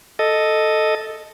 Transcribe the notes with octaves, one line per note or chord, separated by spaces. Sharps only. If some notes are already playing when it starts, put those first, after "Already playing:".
A4 D#5